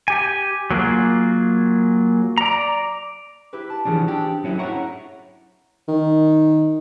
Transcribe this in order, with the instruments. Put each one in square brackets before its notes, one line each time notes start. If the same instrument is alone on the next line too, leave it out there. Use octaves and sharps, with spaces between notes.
[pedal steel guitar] G4 G#5
F#3 A#3 F4 G#4
D5 A#5
[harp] E4 G4 B4
A5
[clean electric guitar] E3 F3 D4 [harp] B3 C#4 G#4
[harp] C4 D4 [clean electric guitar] G4
[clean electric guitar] F#3 C#4 E4
[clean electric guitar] E4 C5 C#5 [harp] F#5 A#5 C#6
[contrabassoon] D#3